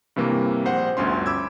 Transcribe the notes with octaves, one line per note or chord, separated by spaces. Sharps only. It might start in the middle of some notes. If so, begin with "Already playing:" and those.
G2 C3 E3 A#3
A#1 C5 F#5
G1 D2 C#4 C6
B5 D6 E6 G#6